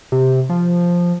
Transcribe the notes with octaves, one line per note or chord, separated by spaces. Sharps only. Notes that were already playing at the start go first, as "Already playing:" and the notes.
C3
F3